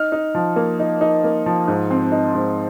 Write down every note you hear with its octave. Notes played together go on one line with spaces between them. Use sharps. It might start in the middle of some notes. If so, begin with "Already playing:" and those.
Already playing: D#4 F6
D#4
F3
A#3
D#4
D#4
A#3
F3
G#2
C4
D#4
G#2